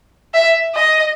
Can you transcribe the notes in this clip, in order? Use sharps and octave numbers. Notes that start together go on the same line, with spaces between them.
E5
D#5